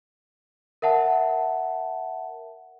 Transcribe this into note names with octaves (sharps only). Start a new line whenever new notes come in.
A#4 E5 F#5 A5